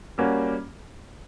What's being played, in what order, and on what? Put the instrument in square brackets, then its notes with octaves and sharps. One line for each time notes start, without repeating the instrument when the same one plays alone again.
[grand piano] G3 A#3 C#4 F#4